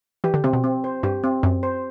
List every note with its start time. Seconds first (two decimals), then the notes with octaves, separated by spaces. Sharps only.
0.24 E3 G4
0.34 D3
0.44 C3 C4
0.53 B2
0.64 C4
0.84 C5
1.03 G2 G4
1.24 C4
1.43 F#2 C4
1.63 C5